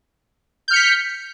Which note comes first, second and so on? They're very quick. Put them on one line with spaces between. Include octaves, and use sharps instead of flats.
G6 F6 C#7 B6